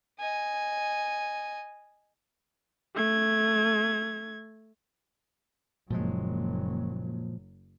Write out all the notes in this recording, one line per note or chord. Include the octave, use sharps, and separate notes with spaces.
D#5 G#5
A3 G#6
F#1 A#2 F3 F#3 G#3